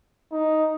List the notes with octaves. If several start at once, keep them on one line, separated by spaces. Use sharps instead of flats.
D#4